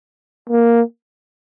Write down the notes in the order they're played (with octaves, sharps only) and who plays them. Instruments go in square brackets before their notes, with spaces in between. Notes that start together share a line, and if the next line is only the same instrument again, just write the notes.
[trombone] A#3